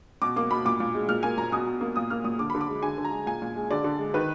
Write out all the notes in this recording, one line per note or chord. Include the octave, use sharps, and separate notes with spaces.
B2 D6
A#3 D6
B2 B5
A#2 D6
A#2
G#3
A#2 F6
A#3 G#5
A#2 A#5
B2 D#6
B2
A#3
A#2 D#6
A#3 F6
A#2 D#6
D3 D6
D3 B5
D6
G#3
D3 G#5
D3
A#5
G#3
A#2 G#5
A#2
G#3
D3 D5
D3
G#3
D#3 B4